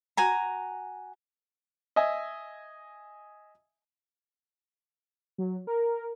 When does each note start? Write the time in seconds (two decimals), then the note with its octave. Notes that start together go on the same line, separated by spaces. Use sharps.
0.17 F#4 G#5 A#5
1.96 D#5 E5 G#5
5.38 F#3
5.67 A#4